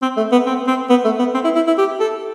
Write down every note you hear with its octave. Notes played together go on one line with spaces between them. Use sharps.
C4
A3
B3
C4
C4
B3
A3
B3
C4
E4
E4
E4
G4
A4